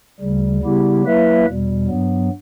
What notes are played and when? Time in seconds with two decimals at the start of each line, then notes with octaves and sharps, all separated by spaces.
0.20 D2 C#3 G3
0.62 C#3 G3 B3 E4 G4
1.03 F#3 A#3 E4 B4 E5
1.46 E2 B2 G3
1.87 G2 F#3 B3